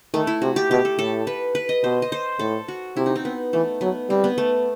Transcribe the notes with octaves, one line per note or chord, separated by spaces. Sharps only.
D#3 A3
E4
C3 F#4
G4
B2 G4
A4
A2 A4
B4
B4
D#5
B2 C5
D#5
C5
A2 A4
F#4
C3 E4
D#4
C4
B3
E3 A3
F#3 B3
G3 C4
B3
A3